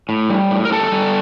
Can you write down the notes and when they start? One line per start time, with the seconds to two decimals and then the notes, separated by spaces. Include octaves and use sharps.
0.09 A2
0.30 G3
0.50 A2
0.65 A#4
0.72 G3 A4
0.92 G3